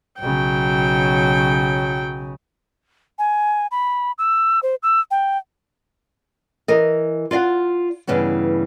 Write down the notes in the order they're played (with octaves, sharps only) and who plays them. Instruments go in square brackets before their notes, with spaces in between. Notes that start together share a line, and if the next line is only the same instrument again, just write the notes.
[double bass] B1 C#3 [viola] F#3 G5
[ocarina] G#5
B5
E6
C5
E6
G5
[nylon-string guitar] E3 A#4 D#5
F4 D5 D#5 F5 F#5
G2 C#3 E3 B3 C#4